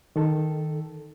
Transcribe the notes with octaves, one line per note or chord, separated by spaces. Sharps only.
D#3 A4